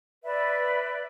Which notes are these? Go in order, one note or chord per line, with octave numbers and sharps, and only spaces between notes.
B4 D5 E5